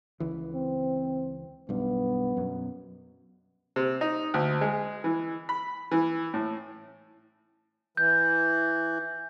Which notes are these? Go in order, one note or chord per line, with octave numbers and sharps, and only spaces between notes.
C#2 E3
C4
B1 G2 B3
F#2 B2
C3
D#4
D2
G#3
E3
B5
E3
A2
E3 G6